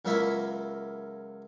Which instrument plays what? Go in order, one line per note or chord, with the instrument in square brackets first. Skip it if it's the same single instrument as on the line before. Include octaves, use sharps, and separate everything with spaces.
[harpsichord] C#2 F#3 A#3 E4 B5 C#6